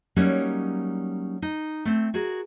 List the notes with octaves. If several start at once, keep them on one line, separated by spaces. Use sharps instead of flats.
F#3 G3 A#3 C#4 D#4
D#4
A3 C4
F#4 G#4 A#4